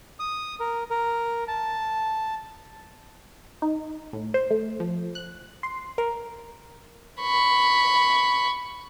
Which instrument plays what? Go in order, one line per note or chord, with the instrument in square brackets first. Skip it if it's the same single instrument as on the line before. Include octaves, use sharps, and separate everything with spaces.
[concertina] D#6
A#4
A#4
A5
[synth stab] D#4
A2
C5
A3
F3
F#6
C6
A#4
[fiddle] B5 C#6